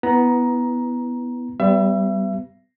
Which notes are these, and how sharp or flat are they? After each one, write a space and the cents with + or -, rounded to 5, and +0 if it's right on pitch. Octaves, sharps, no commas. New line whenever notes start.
B3 +0 E4 -5 A#5 +15
G3 -15 B3 +25 E5 +35